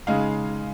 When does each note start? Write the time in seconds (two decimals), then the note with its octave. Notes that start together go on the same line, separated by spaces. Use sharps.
0.07 C#3 G#3 D#4 F5